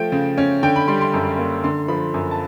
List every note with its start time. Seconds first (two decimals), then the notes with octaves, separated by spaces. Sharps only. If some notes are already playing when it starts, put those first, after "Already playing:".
Already playing: F3 A3 G5
0.12 C#3
0.38 C#4
0.63 D3 G5
0.76 B5
0.88 G3 C6
1.01 C6
1.14 F#2
1.39 A#3
1.64 D3 C6
1.88 F3 B5
2.14 F#2
2.31 A5